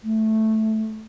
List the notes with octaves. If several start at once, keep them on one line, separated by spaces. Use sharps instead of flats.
A3